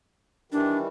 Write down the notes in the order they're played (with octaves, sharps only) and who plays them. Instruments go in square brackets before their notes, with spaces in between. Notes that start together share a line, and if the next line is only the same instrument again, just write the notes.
[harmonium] D#3 E3 G3 [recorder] D4